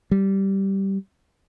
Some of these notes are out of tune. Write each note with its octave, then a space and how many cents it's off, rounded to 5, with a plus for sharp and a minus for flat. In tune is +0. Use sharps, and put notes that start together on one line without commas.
G3 -10